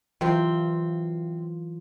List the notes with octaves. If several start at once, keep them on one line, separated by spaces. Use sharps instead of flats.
C3 E3 F#3 C4 F4